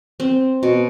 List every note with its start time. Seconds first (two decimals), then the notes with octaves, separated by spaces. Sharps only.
0.20 C4
0.63 B2